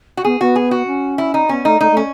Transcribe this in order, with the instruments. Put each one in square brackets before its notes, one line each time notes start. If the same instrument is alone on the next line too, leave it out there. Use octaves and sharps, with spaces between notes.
[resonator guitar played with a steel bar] F#4
[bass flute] B3 [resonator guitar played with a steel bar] G#4
[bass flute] B3 [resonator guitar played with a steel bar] F#4
[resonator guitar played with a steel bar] G#4
F#4
[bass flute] C#4
[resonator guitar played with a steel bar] E4
D#4
[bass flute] B3 [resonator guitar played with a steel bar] C#4
[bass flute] A3 [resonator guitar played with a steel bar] D#4
[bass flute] A3 [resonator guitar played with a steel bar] D#4
[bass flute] A3
[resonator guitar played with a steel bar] C#4